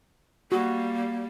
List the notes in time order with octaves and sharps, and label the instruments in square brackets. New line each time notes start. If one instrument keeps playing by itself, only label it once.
[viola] G3 [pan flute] A#3 [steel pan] F#4